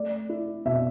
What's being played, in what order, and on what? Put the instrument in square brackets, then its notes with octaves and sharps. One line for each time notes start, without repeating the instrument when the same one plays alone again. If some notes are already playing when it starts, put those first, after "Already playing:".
Already playing: [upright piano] A3 D5
E4
B2 E5